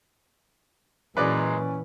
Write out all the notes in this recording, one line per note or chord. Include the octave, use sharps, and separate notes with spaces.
F#2 A#2 E3 G#3 C#4 B4 D5